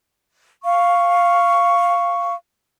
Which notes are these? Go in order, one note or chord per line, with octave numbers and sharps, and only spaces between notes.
F5 C#6